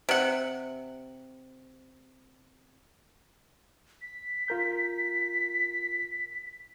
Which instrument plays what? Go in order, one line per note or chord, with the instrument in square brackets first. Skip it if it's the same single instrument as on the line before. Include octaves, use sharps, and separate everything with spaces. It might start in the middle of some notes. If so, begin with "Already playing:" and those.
[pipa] C3 F#5
[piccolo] B6
[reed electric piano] F4 A#4 G6